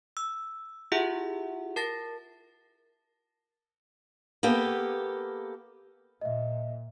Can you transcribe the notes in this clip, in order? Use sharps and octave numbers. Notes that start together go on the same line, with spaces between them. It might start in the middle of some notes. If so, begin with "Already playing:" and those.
E6
E4 F4 G4 G#4 E5 F#5
A#4 A5 A6 A#6
A#3 B3 G4 A4
A#2 D#5 E5